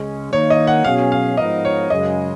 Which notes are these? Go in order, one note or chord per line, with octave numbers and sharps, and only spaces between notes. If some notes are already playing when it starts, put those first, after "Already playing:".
Already playing: C#2 C#3 G#3 C#4
D#3 A#3 D#4 C#5
D#5
F#5
B2 F#3 C#4 G#4 F5
F5
G#2 F3 B3 D#4 A#4 D#5
C#5
F#2 C#3 G#3 D#5